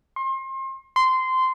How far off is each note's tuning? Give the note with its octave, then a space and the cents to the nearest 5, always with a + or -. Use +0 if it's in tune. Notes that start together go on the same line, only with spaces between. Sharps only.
C6 +35
C6 -15